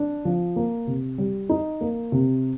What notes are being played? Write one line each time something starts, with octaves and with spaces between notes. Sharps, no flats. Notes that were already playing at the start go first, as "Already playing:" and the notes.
Already playing: D4
F3
A#3
C3
G3
D#4
A#3
C3